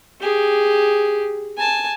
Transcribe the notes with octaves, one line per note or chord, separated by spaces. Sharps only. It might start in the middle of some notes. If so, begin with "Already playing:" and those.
G4 G#4
G#5 A5